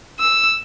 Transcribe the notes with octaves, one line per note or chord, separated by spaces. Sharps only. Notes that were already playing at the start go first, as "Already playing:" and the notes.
E6